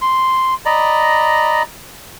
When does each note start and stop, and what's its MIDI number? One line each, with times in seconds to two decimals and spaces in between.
0.02 0.54 84
0.65 1.62 74
0.65 1.62 75
0.65 1.62 82
0.65 1.62 83